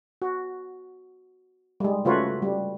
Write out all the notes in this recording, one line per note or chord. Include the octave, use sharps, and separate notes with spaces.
F#4
G3 G#3
C#3 A3 F4 F#4 B4 C#5
G3